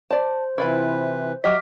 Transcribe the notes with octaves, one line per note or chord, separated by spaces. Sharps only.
C5 D5 A5
C3 E3 E4 F4 B4 B5
F#3 G4 D#5 E5 D6 F6 B6